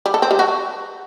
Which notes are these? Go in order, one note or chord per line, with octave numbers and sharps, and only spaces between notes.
G3
A4
C4
G3
F#4